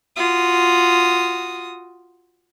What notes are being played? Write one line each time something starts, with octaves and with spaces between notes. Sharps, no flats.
F4 F#4 D#6